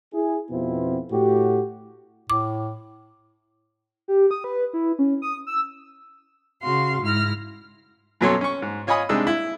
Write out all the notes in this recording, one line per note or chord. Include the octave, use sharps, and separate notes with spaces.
E4 G#4
F2 B2 B3 C4 E4 F4
A2 F#4 G4
A2 D6
G4
D#6
B4
E4
C#4
D#6
E6
C#3 F#4 F5 C6
G#2 E4 F6 A#6
F#2 B2 F#3 A4 C#5 C6
C#4 C#6
G#2
F4 C#5 D#5 G#5 B5 D#6
C3 G#3 D4 D#4 E6
E4